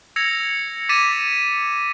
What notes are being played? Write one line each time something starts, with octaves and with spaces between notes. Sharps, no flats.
E6 G#6 A#6 C#7 F7
D6 A6 B6 D#7 E7